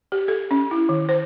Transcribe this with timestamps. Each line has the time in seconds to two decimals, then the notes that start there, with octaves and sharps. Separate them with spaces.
0.12 G4
0.28 A4
0.51 C#4
0.71 E4
0.89 D#3
1.09 C5